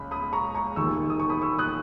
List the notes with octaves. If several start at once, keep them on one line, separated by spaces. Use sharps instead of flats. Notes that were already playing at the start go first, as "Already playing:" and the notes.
Already playing: C#2 C#3 G#3 B5
B5 D#6
A#5 C#6
A#5 C#6
E1 D#2 D#3 C#6 E6
D#6
C#6
B5 D#6
C#6 E6
D#6 F#6